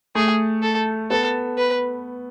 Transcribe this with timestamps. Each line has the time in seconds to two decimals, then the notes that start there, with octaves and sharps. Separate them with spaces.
0.15 A3 G#4
0.62 A4
1.10 B3 A4
1.58 B4